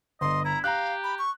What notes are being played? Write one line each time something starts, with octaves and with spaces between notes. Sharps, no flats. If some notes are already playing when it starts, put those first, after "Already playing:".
G1 D#5 C6
E4 A#5
G4 F5 A#5 F#6
B5
C#6